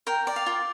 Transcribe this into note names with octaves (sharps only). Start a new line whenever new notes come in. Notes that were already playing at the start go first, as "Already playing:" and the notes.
A#4 G5
D5
F5
F4